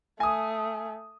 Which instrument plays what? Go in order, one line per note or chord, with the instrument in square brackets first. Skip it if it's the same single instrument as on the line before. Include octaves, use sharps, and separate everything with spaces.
[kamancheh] A3 [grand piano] G#5 D#6